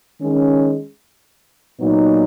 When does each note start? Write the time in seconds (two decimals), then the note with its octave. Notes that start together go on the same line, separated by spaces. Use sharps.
0.19 D#3 G#3 C#4
1.80 A#2 F#3 B3 D#4